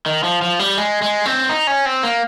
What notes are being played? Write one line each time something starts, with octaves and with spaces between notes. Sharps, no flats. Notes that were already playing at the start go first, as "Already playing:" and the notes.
D#3
F3
F3
G3
G#3
G#3
C4
D#4
C#4
C4
A#3